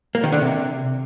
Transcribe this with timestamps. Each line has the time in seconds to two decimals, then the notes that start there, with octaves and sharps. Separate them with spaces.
0.15 A#3
0.24 D#3
0.32 D3
0.41 C3